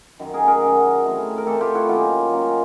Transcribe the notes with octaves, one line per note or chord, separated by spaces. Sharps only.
F#2 D#3 F#3
G#4 A#4
G#4 A#4
F#2 D#3 F#3
E3 A3 C4
A#4
E3 A3 C4 G4 A4
F4 G4
E4 F#4
D#3 F#3 A#3 C#4 F4 G4
D#3 F#3 A#3 C#4